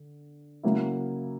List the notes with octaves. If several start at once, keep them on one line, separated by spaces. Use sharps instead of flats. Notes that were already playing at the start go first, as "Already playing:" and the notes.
Already playing: D3
C#3 F#3 A#3 E4